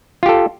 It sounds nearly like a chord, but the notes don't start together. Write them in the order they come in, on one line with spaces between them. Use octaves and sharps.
F4 G4 A4